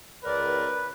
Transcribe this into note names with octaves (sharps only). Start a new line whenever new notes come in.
C#2 A#4 B4 D5